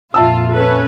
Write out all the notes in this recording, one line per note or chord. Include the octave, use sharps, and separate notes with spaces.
F2 A#2 F4 E5 A5 E6
C#4 A4 B4